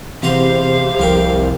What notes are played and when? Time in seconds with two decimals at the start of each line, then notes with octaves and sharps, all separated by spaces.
0.23 E2 C3 G4 C5 F5 A#5 C6
0.99 C2 F2 A#4 G5